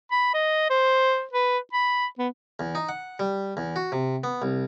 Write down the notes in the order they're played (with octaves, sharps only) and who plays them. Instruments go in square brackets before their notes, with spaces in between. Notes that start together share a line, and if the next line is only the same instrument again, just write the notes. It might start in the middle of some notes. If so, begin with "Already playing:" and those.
[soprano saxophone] B5
D#5
C5
B4
B5
B3
[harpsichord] E2
D#4
F#5
G3
E2
F#4
C3
B3
C2